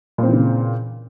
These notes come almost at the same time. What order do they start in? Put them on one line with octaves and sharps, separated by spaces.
A#2 C4 E3 C#3